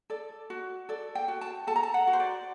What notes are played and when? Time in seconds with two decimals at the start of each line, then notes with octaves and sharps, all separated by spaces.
0.10 A4 D5
0.50 F#4
0.89 A4 D5
1.15 G5
1.28 F#4
1.41 A5
1.67 A4 A5
1.76 A#5
1.83 A5
1.94 F#5
2.07 F#4
2.13 C5
2.20 D5